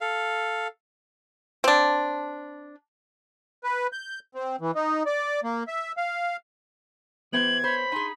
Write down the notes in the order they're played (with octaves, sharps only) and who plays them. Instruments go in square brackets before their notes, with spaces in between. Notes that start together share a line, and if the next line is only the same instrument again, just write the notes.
[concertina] A4 F5
[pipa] C4 D4
[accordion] B4
G6
C4
E3
D#4
D5
A#3
E5
F5
[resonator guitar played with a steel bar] E3 G4 C5 [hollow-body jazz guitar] B3 [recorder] G#6 [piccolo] F#7
[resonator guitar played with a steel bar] C5 C#5 [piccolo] B5
[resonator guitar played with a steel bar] D#4 G#4 [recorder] C6